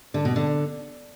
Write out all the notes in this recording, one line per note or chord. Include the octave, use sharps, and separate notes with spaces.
D3
B2
D3